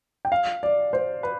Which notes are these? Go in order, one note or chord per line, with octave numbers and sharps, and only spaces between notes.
G5
F5
D5
C5
B4